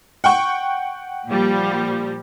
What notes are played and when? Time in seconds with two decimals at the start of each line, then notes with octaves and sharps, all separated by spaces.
0.24 F#5 G5 C#6
1.27 A#2 F3 G3